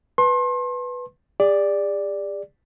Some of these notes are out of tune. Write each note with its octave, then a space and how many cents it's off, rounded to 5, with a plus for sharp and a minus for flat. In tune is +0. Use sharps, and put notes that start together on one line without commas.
B4 +0 A5 +0 C6 +35
G#4 -45 D5 +0